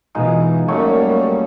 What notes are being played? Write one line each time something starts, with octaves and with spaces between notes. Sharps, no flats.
B2 E3 G#3 D#4 F4
F#2 G3 A3 A#3 C#4 C#5